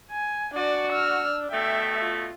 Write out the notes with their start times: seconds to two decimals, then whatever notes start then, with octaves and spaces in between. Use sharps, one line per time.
0.11 G#5
0.55 D4 F#4 D5
0.93 E6 F6
1.52 B2 A3 E5 G5
2.01 F4